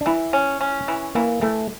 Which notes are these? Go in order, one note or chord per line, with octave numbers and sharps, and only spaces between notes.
D4
E3 E4
C#4
C#4
E3
E3 A#3
E3 A3